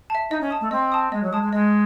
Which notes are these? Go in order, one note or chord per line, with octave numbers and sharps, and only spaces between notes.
E5 A5
D#4 D#5
C#4
A5 D#6
A3
C4 D#5
A5 D#6
G#3 D#5
F#3
G#3 A5 D#6
G#3
G#3 D#5